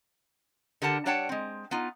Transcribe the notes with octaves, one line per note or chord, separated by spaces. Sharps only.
D3 G4 A#4 F#5 A5
G3 D4 C#5 F#5 G5 A5
G#3 C4
B3 D#4 F4